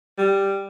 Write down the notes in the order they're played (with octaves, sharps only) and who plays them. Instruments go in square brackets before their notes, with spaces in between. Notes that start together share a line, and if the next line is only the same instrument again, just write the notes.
[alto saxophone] G3